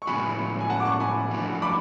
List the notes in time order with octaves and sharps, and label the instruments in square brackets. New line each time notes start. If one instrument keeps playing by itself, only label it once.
[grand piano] C#6
[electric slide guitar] A2 F3 G#3 B3 F#4 [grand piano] G#5 B5
[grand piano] G#5
F#5 A5
D6
A5 C#6
G#5 B5
[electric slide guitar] F3 A3 D4 F#4
[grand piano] B5 D6